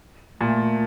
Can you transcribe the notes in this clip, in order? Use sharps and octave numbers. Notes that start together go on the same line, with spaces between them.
A#2 A3